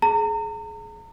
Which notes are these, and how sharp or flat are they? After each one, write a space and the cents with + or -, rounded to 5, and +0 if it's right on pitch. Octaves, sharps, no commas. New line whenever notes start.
G#4 +25 A#5 -40